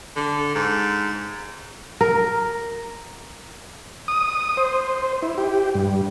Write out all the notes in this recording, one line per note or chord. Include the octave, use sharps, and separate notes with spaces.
D3
G#2
A#4
D#6
C5
E4
G4
G2